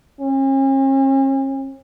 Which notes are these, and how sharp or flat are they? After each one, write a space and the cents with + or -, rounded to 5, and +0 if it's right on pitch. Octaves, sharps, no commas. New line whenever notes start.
C#4 -45